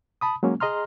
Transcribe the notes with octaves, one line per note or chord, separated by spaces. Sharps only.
A5 B5 D#6
F#3 G#3 A#3 C#4
G#4 D#5 A#5 C6 F6